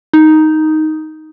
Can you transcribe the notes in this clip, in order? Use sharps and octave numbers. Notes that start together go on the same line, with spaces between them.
D#4